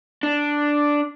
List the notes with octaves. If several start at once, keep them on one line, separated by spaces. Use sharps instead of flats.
D4